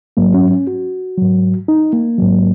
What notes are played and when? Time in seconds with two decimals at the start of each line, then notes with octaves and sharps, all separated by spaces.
0.17 G#2 F#3 A#3
0.34 C#4
0.51 C#4
0.67 F#4
1.18 G#2 F#3
1.68 D#4
1.93 A#3
2.18 G#2 F#3